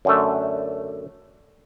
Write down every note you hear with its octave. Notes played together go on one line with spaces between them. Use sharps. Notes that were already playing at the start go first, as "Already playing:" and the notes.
F#2 D3 A3